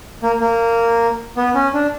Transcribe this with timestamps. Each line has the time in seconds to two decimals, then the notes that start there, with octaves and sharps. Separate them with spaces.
0.23 A#3
0.41 A#3
1.36 B3
1.54 C#4
1.74 D4